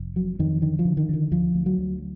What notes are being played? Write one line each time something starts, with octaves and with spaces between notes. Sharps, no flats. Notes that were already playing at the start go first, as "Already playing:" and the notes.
Already playing: F1
F2 F#3
F2 D#3
D3 D#3
F3
D3
D#3
D3 D#3
D2 F3
D2
F#3
D2